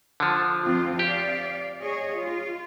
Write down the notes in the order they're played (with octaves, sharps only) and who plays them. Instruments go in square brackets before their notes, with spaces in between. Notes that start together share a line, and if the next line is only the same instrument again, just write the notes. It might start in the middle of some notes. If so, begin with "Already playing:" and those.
[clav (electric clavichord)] D3 F3
[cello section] F2 C4 F4
[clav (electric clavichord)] G4 [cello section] D5 F5
[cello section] G#4 C#5 D#5
F4